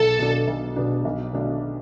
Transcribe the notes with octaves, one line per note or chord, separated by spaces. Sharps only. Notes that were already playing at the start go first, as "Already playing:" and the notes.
Already playing: B1 A4
B2 B3 D4
B1
B2 B3 D4
B1
B2 A3 D4